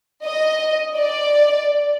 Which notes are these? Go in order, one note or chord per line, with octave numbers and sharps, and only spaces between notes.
D#5
D5